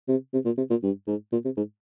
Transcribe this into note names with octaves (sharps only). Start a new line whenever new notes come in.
C3
C3
A#2
C3
A#2
G2
G#2
A#2
C3
G#2